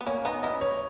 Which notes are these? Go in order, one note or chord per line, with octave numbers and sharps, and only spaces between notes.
B3
A#3 C#4 C#5
B3 D#4 D#5
C#4 E4 D#5
C#5